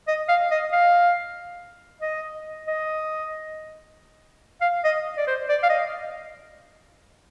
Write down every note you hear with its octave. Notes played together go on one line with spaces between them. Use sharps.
D#5
F5
D#5
F5
D#5
D#5
F5
D#5
D5
C5
D5
F5
D#5